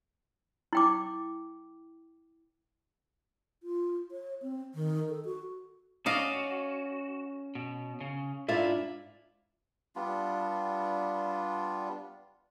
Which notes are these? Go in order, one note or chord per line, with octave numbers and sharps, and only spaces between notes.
E4 G5 D6
F4
C#5
C4
D#3
A4
F#4
C#4 F#4 D5 D#5 F5
B2
C#3
G#2 D4 E4 F4 E5
G3 B3 D4 F4